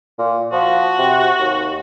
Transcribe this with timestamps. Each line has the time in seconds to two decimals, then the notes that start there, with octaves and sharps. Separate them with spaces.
0.19 A#2
0.52 F3 F#4
0.98 C3
1.39 D#2